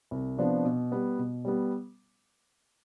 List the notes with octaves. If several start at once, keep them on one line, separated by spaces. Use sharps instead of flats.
C2
C3 F3 B3 D4
B2
G3 B3
B2
G3 B3